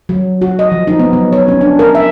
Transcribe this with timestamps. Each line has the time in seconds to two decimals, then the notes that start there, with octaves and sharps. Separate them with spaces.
0.09 F#3
0.42 F#4
0.59 D#5
0.72 F3
0.87 D#4
0.99 B3
1.13 F#3
1.33 C#5
1.48 C#4
1.61 D4
1.79 A#4
1.95 E5